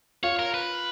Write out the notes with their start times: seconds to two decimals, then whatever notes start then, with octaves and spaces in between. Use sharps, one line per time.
0.23 F4 C#5
0.39 A#4
0.54 B4